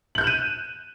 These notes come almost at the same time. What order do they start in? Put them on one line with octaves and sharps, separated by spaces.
F#7 G6 F#6 E7 D#7